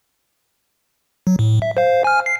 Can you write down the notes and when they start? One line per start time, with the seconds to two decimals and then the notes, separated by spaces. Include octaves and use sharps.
1.27 F#3
1.39 A2
1.62 E5
1.77 C5 F5
2.04 G#5 F6
2.26 C7